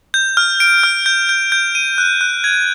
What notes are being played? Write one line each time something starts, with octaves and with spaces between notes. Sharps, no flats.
G6
F6
D7
F6
G6
G6
G6
D#7
F#6
F#6
G#6